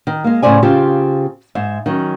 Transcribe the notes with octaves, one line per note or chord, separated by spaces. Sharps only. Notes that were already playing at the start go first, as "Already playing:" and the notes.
D#3
G#3 A#3
A2 C#3 F3 C5 D5 G#5
C#3 C4 F4 G4 A5
G#2 E5
D#3 F#3 C#4